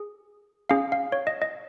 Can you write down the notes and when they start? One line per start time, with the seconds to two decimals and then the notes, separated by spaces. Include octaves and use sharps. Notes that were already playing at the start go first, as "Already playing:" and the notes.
Already playing: G#4
0.70 C#4 G#4 F5
0.92 F5
1.12 C#5
1.27 D#5
1.42 D#5